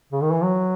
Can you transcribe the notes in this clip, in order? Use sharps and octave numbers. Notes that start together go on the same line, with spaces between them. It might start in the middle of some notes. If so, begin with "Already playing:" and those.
C#3
D#3
E3
F#3